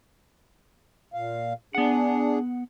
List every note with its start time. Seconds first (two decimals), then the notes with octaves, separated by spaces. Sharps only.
1.14 A#2 F5
1.75 B3 D4 G#4 F#5